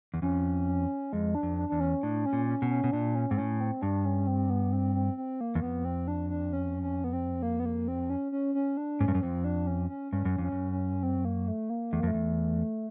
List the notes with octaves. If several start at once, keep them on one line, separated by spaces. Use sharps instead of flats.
E2
F2 C#4
F2 G#3
D4
F2
D4
E2 D4
C#4
A2 D4
C#4
A#2
C#4
B2
C#4
B2
A#2 D4
C#4
G#2 C4
A2 C#4
C4
G2 D4
C#4
C4
B3
C4
C4
C4
A#3
E2
F2 B3
C4
D4
D4
C#4
C#4
B3
C4
A#3
B3
A#3
C4
C#4
C#4
C#4
D4
G#2 C#4
G2
F#2
F2 C4
D4
C#4
C#4
G2 C#4
F#2
F2 C#4
F#2
C#4
C4
A#3
A3
A#3
E2 A3
A#3
F2 A3
E2